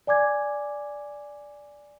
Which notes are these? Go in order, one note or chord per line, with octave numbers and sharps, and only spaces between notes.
D5 G#5 D6 G#6